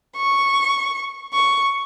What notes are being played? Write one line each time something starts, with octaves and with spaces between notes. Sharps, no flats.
C#6
C#6